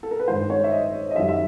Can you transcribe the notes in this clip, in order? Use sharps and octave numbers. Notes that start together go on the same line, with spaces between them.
A4
A#4
B4
G2 D#3 G#3 C5
C#5
E5
D#5
D#5
F#2 D#3 G3 E5
E5